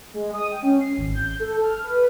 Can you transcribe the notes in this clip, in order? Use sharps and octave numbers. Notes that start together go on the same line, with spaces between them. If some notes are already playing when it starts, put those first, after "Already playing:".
G#3
D#6
G5
C#4
C7
G#1
G6
A4
F6
B4